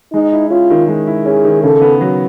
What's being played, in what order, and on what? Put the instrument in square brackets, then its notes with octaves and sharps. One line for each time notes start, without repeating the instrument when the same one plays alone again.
[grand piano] G#3 [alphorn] D#4
[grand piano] E4
[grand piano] C#4 [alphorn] F4
[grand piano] D#3
G#3
E4
[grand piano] C#4 [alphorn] G#4
[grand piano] D#3
[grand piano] C#3 [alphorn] A4
[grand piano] B3
F#3